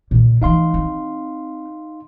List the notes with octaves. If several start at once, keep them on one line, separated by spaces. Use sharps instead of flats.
A#2 C#3
E3 A3 D#4 F5 C6
C4